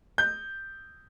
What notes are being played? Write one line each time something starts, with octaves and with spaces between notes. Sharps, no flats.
G6